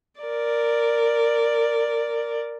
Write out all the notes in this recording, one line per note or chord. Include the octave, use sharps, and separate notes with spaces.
A#4 D5